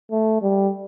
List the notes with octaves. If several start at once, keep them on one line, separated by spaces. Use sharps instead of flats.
A3
G3